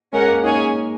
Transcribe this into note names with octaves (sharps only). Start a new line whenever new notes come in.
G#3 C#4 A#4 F#5
A#3
C#4 D#4 G#4 C#5 G#5